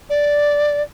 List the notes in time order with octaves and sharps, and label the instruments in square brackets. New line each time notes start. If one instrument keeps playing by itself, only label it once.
[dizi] D5